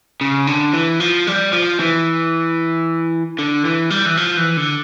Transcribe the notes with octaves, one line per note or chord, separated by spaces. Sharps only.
C#3
D3
E3
F3
G3
F3
E3
D3
E3
G3
E3
F3
E3
D3